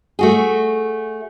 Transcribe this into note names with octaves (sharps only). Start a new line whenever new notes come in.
A3 F#4 G#4